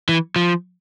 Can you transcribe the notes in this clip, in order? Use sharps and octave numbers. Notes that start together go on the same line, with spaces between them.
E3
F3